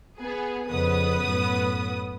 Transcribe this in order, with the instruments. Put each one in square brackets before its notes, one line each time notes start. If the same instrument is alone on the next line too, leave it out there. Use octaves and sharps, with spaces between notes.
[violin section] B3 G#4
[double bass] F2 C#3 [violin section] B3 B4 D#6
[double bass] F#2 A2